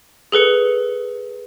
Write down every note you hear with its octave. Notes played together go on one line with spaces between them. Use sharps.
G#4 A4 B4 C#7